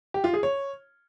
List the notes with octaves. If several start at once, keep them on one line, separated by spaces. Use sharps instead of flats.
G4
F4
G#4
C#5